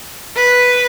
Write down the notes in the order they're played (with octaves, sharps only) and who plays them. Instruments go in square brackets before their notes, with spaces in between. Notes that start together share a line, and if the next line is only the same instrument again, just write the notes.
[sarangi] B4